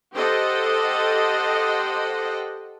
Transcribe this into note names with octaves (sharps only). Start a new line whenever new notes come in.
G4 A4 C5 D#5 F#5